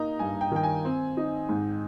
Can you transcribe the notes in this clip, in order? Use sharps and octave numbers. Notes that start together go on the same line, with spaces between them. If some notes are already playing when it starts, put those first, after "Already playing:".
Already playing: A#3 D#4 A#5
G2 G#5
G5
D#3 G5
G#5
C4
D#4
G#2